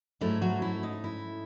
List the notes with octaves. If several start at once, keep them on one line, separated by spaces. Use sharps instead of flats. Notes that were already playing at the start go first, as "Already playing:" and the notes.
G#2 F#3 A3 C#4 E4
F#3 F#4
E4
D#4
E4